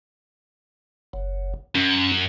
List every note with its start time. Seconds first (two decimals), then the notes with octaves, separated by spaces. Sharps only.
1.13 F#1
1.75 F#2 C#4